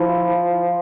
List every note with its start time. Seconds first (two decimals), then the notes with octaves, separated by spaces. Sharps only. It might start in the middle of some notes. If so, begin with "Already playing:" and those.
Already playing: F3 E4
0.67 F4